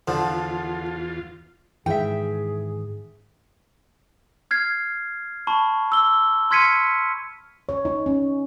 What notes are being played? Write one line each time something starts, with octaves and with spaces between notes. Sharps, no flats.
E2 D3 F3 F4
G#2 D#3 E3 G#4 E5 G5
F6 G#6 C7
A5 B5 C#6
E6 G7
C6 F6 G#6 B6 C#7 D#7
C#5
D#4
C#4